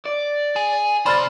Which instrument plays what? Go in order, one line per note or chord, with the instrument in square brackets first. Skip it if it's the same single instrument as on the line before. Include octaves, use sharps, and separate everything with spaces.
[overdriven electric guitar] D5
[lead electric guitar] G#4
[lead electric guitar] C3 [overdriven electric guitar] C5 [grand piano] D5 A6 [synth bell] B5 F6